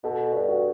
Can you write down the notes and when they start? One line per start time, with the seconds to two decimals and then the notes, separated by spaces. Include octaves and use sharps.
0.04 B2 A4
0.33 G2
0.48 F#4